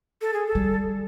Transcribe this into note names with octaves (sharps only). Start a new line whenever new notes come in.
A4
G#4
A4
G3